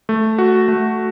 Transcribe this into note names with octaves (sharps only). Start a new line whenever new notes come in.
A3
F#4
A3